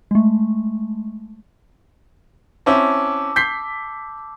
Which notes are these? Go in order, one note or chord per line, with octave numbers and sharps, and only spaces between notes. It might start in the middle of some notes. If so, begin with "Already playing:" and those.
G#3 A3
C4 C#4 E4 A5 D6 E6
G6 B6 C7